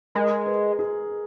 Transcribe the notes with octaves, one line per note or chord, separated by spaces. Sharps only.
G#3 A#4
B4
G#4